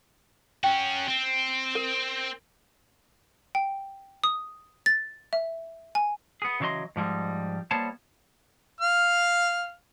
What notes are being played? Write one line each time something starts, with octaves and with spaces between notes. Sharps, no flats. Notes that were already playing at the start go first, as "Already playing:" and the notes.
C#4 F#4 G5
C4
A#4
G5
D#6
A6
E5
G#5
B3 G#4
C#3 E3 F#3 C#5 D#5 C6
G#2 F3 G3 G#3
G3 A#3 B3 C5 C#5 A5
F5 F6